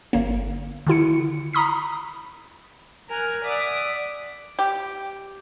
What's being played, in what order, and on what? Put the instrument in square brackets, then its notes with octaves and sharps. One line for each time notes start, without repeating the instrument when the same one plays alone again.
[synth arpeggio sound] G1 A#3
D3 D#3 E4 C#7
A#5 B5 D#6 B6
[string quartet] A#4 G#5 F6 F#6
D5 E5 F#5 D6 D#6
[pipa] G4